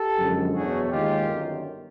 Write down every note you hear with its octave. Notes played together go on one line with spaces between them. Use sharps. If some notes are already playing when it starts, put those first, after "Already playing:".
Already playing: G4 A4
F#2 D3 F3 G#3
E2 B2 F#3 A3 F#4 G#4
D#2 D#3 G#3 F4 G4
G1 F#2 D#3